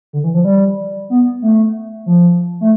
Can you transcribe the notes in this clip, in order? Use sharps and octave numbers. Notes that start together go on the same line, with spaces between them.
D3
E3
F3
G3
B3
A3
F3
A3